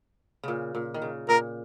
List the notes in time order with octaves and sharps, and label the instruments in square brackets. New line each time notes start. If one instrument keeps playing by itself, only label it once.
[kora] A#2 C#3
A#2
D#3
C#3
[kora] A#2 [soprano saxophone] A#4